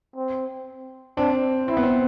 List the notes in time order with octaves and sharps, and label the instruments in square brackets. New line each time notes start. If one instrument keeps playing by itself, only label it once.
[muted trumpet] C4
[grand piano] C4 [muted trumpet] D4
[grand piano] C4 [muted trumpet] E4
[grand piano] B3
C4